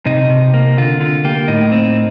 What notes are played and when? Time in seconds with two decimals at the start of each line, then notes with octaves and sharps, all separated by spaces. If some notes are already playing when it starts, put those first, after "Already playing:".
0.06 C3 D#4
0.30 C3
0.54 A#3
0.77 D3 F4
1.01 D3 F4
1.25 A#3 G4
1.48 A2 D#4
1.72 C4